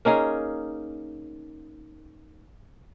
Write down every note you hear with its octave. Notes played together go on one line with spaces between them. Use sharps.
A#3 C#4 D#4 G#4